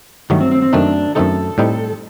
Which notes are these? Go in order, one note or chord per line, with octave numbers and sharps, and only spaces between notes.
G2 D#3 F#3 A3 D#4
C4
C4
C4
F#2 D#3 A3 C4 D4 D#4
F#2 D#3 A3 C4 D#4 A4
A2 G3 C4 D#4